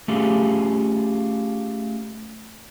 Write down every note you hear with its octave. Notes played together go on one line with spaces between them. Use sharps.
A3 C#4 F4 G4 G#4